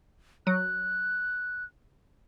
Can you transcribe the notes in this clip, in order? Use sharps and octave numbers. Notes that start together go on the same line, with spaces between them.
F#3 F#6